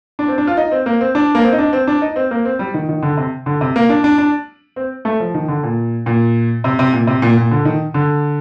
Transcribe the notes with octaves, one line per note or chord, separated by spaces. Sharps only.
D4
C4
D4
F4
D#4
C4
A#3
C4
D4
A#3
C4
D#4
D4
C4
D4
D#4
C4
A#3
C4
G3
D#3
D#3
D3
C3
D3
C3
A#3
D4
D4
D4
C4
A3
F3
D#3
D3
A#2
A#2
C3
C3
A#2
C3
A#2
A#2
D3
D#3
D3